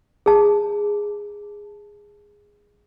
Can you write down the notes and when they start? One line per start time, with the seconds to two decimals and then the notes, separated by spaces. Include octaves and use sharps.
0.26 G#4 A5